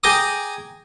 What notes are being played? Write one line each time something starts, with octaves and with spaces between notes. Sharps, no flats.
G#4 G5 G#5 A#5 D6 D#6